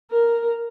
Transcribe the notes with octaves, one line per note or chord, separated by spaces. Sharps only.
A#4